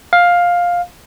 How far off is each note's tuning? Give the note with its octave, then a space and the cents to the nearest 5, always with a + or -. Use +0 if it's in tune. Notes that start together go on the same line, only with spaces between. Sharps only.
F5 +10